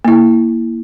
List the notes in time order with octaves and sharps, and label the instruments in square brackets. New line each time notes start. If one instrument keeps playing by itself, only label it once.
[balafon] A#3 E4